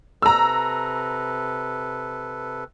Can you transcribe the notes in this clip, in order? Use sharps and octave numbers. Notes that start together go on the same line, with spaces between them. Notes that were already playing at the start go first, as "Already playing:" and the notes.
C3 A4 B4 A#5 E6